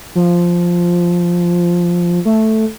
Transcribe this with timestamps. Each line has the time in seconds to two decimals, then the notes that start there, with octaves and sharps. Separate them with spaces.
0.15 F3
2.25 A3